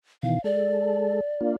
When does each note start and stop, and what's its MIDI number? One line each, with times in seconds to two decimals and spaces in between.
0.23 0.39 47
0.23 0.39 51
0.23 0.39 52
0.23 0.42 77
0.44 1.21 56
0.44 1.21 69
0.44 1.52 74
1.41 1.56 58
1.41 1.56 62
1.41 1.56 65